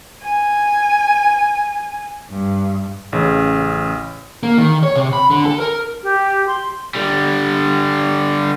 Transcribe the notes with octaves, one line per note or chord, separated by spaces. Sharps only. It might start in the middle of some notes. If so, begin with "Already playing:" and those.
G#5
G2
A1 C#3
A#3
D#3
C#5
C3
B5
D3
A4
A#4
G4
C6
D3 G3